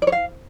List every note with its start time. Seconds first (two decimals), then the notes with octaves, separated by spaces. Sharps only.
0.02 D5
0.07 C#5
0.12 F5